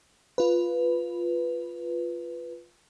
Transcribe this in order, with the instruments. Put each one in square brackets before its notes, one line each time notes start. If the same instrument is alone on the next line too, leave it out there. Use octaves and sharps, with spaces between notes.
[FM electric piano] F4 B4